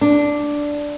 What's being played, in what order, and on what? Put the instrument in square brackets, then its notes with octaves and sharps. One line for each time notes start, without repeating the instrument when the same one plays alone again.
[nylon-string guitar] D4